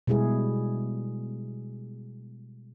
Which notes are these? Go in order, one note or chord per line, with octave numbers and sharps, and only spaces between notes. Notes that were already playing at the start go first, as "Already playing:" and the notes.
B2 G3 G#3 E4 G#4